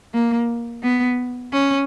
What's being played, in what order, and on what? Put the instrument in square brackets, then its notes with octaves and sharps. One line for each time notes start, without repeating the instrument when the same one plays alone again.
[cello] A#3
B3
C#4